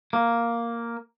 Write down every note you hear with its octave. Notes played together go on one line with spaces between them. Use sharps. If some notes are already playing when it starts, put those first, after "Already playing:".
A#3